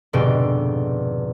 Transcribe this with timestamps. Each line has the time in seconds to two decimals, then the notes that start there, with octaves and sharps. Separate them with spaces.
0.13 F1 G#2 B2 D3 D5 G5